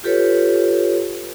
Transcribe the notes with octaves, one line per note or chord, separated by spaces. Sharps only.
F4 G4 A4 B4 C#5